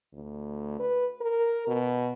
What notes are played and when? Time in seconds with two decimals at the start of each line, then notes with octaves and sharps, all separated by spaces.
0.14 D2
0.80 B4
1.21 A#4
1.67 B2